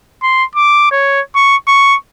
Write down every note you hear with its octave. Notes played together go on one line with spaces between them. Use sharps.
C6
D6
C#5
C#6
C#6